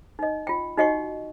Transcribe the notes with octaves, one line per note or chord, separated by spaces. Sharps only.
D#4 D#5
F4 G5
D#4 F#4 D#5 F#5 G5 C#6